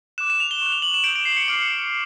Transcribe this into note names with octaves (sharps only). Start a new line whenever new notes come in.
D6 F#6 E7
E7
F7
G7
C#6 F#6
F7
F#7
E7
D#6 G6 D7
D7
C7
C#7
D6 F6 D7
C#7
C#6